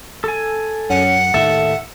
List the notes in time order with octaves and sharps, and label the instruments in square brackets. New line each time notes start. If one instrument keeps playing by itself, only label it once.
[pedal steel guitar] A4 G#5
[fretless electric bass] F#2 [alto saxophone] C#4 [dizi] F#5
[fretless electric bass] D#2 A2 D#3 [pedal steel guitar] A4 [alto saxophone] E5